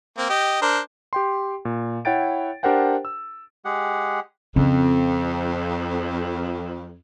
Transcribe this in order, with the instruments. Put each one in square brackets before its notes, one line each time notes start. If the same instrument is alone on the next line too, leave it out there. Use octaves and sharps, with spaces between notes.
[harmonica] A#3 C4
G4 D#5
D4 A#4 C5
[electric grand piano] G4 G5 C6
A#2
E4 C#5 F#5 G5 A6 D7
D4 G4 A#4 C5 F#5 G5
E6
[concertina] G#3 G4 G#4 F#5
[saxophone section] F2 [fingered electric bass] C#3 [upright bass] C4